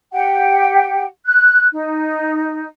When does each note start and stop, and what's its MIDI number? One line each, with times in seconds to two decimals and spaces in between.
0.12 1.03 67
0.12 1.03 78
0.12 1.03 79
1.26 1.66 90
1.72 2.65 63